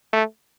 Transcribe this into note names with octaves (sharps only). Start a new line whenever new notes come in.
A3